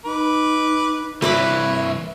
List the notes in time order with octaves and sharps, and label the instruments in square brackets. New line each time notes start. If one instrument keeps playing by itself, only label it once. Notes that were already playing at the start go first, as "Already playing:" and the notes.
[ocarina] D#4 [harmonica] B4 D6
[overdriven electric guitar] C2 E3 [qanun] B4 B5 D6 [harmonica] C#5 [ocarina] E5